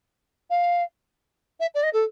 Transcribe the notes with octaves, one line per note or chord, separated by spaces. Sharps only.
F5
E5
D5
D#5
A4